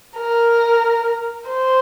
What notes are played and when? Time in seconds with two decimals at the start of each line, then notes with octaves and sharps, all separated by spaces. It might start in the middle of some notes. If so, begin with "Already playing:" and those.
0.17 A#4
1.48 C5